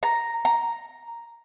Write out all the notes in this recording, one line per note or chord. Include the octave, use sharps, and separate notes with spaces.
A#5
A#5